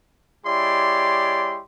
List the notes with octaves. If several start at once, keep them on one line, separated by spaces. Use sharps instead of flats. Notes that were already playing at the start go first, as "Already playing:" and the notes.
G#3 E4 G4 C#5 D5 C6